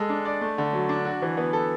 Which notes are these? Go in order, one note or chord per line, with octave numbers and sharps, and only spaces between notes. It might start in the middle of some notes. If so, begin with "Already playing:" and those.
Already playing: G#3 A4
D4
D5
A3
D3
F#3
D4
F#4
E3
B3
A4